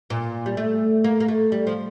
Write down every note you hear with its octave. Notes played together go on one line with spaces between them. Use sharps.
A#2
G3
A3
A#3
A#3
A3
G3
F3